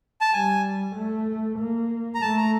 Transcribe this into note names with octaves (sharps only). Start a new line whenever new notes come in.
A5
G3 G#5
A3
A#3
A#5
A3 A5
A#5